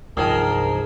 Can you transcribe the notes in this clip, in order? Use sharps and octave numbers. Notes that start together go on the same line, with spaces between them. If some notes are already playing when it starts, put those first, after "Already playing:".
C2 G2 D#3 F3 G#4 A#4